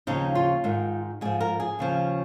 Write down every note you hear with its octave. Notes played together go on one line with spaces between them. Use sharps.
D#2 C#3 F3 D#4
F4
G#2 D#3
G#2 F3 G#4
A#4
G#4
D#2 C#3 F3